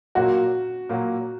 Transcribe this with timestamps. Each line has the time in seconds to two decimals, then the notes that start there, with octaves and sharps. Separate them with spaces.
0.15 A#2 F#3 A#3 F#4
0.89 A#2 F#3 A#3